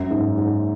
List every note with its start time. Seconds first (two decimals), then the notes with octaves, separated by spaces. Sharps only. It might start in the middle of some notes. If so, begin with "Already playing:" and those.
Already playing: F#2
0.11 G#2
0.38 G#2